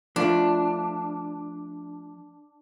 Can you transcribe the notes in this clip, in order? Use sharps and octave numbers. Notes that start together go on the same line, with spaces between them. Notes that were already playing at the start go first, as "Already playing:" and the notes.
F3 A3 D4 F4